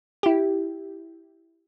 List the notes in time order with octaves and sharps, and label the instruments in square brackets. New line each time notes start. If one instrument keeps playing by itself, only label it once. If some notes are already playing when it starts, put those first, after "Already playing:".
[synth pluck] E4 G4